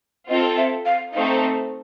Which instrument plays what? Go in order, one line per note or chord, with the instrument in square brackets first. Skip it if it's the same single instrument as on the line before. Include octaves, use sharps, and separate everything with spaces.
[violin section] C4 F4 A4 [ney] D#5
[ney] E5
F5
[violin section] A3 C4 D#4 [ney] F5